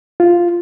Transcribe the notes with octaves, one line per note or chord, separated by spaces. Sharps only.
F4